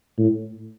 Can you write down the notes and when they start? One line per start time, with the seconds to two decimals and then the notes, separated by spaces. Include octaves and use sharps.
0.18 A2